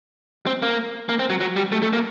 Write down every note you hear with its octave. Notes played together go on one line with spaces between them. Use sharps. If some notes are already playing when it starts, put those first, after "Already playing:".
C4
A#3
A#3
C4
F#3
F#3
G3
A3
A3
A#3